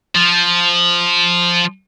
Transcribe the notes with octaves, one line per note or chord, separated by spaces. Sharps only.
F3